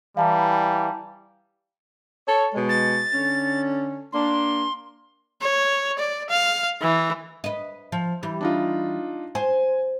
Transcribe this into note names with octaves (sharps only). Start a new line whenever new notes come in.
E3 G3 F5 A5 A#5
A4 C#5
B2 G#3
A6
D3 C#4
A#3 D4 C6
C#5
D5
F5
E3
B4 D#5
F3
E3 G3
D4 D#4 F4
C5 G#5